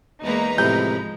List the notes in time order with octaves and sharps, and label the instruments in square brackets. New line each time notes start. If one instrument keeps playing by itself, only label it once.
[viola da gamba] E2 G#3 A#3 [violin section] D#4 B4 A#5
[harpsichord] A2 C3 [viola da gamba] F3 G#3 [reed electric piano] G6